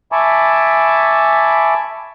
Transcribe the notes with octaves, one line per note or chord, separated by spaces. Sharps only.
E5 G#5 A5 B5 C#6 D6